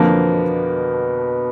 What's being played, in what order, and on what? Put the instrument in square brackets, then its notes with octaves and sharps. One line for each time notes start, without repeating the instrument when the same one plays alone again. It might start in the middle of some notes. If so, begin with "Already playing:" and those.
Already playing: [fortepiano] F2 D3 F3 A#3 [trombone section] B2 B3